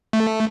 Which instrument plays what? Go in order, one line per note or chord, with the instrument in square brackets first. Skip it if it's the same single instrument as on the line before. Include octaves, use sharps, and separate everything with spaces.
[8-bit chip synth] A3